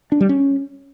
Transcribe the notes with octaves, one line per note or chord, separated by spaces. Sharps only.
D4
G3
C#4